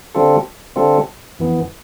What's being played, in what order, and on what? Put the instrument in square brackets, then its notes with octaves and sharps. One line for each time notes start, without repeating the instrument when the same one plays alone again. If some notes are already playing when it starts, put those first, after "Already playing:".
[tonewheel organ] D3 G3 C4 F4 A4
D3 G3 C4 F4 A4
F2 E3 B3